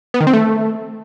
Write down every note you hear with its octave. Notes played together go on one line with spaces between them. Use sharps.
B3
D#3
C4
A3